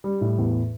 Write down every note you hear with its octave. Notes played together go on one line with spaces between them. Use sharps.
G3
A2
E2